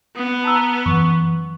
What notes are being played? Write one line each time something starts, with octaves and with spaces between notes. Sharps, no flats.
B3 D#6
A5 A#5 E6
F#2 E3 C#6